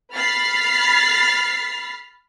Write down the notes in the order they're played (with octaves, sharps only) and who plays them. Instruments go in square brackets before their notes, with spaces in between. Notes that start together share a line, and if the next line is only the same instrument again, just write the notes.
[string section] B5 F6 A6 B6 C7